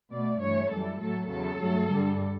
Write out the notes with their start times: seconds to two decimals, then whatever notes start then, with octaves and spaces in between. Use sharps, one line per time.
0.11 B2 A3 D5
0.41 G2 E3 A3 C#5
0.71 F#2 E3 G3 A4
1.00 A2 F#3 A3 A4
1.29 E2 C#3 F#3 A4
1.59 G2 F#3 A3
1.89 G2 D3 G3